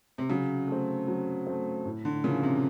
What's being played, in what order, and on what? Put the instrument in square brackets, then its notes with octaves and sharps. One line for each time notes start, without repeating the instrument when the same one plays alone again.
[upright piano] C3
[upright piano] C#3 [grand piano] F#3
[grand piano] A3 C4
F#3
A3 C4
A2
[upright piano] D3
[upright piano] C#3 [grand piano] F3 A#3 C#4 E4
[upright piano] C3